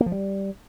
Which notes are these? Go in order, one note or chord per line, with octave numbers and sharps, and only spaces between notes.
A#3
F3
G3